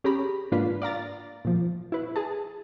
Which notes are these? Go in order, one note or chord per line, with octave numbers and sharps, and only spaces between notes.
C#4 G4 G#4 A#5 B5
G#2 A#3 D4 F4 B4 B6
D5 F5 A#5 A6
A#2 F3
E4 B4
G#4 A5